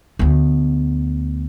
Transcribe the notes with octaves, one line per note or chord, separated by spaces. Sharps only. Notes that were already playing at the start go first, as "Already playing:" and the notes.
D2 B3